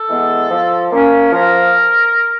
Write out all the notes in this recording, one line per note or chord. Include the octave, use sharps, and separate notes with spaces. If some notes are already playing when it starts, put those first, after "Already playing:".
Already playing: A4
E3 G#3 B3
F3
A#3 C#4
F3 A#4